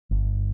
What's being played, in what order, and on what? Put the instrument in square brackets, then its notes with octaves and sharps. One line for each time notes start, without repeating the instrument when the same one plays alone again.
[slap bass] G1